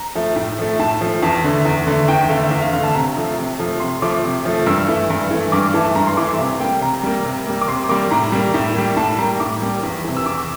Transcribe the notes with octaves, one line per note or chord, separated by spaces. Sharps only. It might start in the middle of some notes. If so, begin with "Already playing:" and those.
Already playing: A#5
F3 A3
A2
F3 A3
A2 A5
F3 A3
E2 A5
D3 A3
E2
D3 A3
E2 G5
E5
D3 A3 F5
E5
E2 F5
F5
D3 A3 F5
A5
C3 A#5
F3 A3
C3
F3 A3
C3 C6
F3 A3 D6
C3
F3 A3
G2 E6
E3 A3
G2
E3 A3
G2 D6
E3 A3 A5
G2 A#5
C6
E3 A3 D6
E5
C3 F5
G3 A#3 G5
C3 A#5
G3 A#3
C3
G3 A#3
D6
C3 C6
G3 A#3 D6
A2 A#5
G3 A#3
A2
G3 A#3
A2 A5
G3 A#3 A#5
A2 D6
G3 A#3
E2
C3 E3
E6
E2 D6